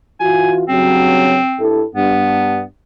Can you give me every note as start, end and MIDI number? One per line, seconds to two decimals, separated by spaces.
0.20 0.62 52
0.20 0.62 65
0.20 0.62 66
0.20 0.52 80
0.68 1.38 43
0.68 1.38 49
0.68 1.38 54
0.68 1.63 60
1.59 1.82 43
1.59 1.82 64
1.59 1.82 69
1.95 2.61 43
1.95 2.62 59